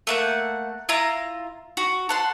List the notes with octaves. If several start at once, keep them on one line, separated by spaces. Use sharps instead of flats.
A3 A#3 F#5
E4 F4 A#5
F#4
A4 F#5 C6